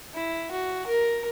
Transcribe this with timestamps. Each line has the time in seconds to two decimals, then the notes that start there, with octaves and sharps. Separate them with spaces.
0.14 E4
0.51 F#4
0.87 A#4